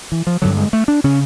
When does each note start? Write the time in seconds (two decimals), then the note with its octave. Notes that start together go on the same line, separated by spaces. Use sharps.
0.12 E3
0.27 F3
0.42 G2 D3 F#3
0.57 G#3
0.73 A3
0.88 D4
1.04 C#3 C#4